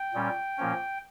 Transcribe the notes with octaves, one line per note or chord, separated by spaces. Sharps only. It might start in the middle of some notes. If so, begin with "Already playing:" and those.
Already playing: G5
A#2 G3 C#4
A#2 F3 A#3 C#4